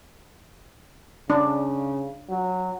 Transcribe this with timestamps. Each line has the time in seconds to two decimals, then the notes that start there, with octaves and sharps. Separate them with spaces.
1.30 C#3 D4
2.29 F#3